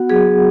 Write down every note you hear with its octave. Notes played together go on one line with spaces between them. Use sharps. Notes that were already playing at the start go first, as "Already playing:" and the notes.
Already playing: B3 F#4 F#5
F#3 G#4